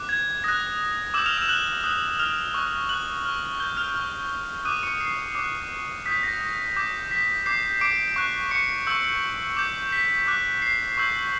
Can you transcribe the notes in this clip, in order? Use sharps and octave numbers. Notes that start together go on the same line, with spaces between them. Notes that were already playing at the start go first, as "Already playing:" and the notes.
Already playing: D6 F#6
G#6
D#6 F#6 A#6
D6 E6 G6 E7
F6 F7
E6 E7
F#6 F#7
D#6 F#6
F6 F7
C#6 F#6
F#6 F#7
C#6 F6
G6 G7
F6 F7
C#6 F6
D6 D#6 F#6 D#7
C#6 C#7
C7
D6 F#6
D#6 G6 B6
A#6
A#6
D6 G6
B6
D6 G6 C7
D6 D7
C#6 F#6
C#6 C#7
C#6 E6 G6
D6 G6
B6
D6 F#6
C7
C#6 E6 G6